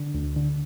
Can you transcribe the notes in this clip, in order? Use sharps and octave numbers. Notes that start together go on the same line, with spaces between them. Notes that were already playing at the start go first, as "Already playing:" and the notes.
Already playing: D3
D2
D3